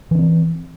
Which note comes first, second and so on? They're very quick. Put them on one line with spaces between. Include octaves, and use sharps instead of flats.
E3 C#4 C4